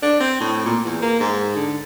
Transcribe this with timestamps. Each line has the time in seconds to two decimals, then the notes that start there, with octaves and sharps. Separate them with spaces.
0.02 D4
0.20 C4
0.41 A2
0.65 A#2
0.84 E2
1.02 A#3
1.20 G#2
1.56 D3